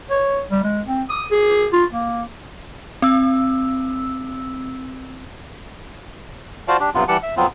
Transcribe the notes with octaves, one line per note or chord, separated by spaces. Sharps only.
C#5
G3
G#3
C4
D#6
G#4
F4
A#3
C4 E6
F4 F#4 C5 D5 F5 A5
D4 G4
G2 C3 F#3 B3 F4
E3 G3 G4 F#5 A5
E5
F2 F#3 B3 C4 F4